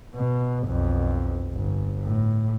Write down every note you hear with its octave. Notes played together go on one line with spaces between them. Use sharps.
B2
B1 F2
G1
A2